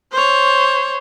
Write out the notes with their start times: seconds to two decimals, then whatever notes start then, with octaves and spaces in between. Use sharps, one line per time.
0.12 C5 C#5